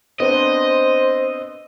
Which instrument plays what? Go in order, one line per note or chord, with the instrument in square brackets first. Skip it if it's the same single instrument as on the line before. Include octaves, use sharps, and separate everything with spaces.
[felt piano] B3 C4 D4 [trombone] C5 [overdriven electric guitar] D#5